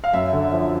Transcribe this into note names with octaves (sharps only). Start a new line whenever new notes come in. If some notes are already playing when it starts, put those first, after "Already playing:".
F5
F#2 E5
D3
F3